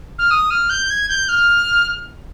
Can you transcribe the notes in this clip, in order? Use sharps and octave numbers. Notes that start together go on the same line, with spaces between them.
F6
D#6
F6
G6
G#6
G6
F6